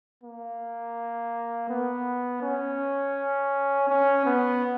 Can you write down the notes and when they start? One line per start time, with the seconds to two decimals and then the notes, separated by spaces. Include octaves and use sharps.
0.23 A#3
1.70 B3
2.43 C#4
3.89 C#4
4.26 B3